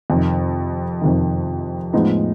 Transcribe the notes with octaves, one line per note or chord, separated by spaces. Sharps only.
F2 C3 D#3
F2 C3 D#3
A2 F3 G#3 B3 D#4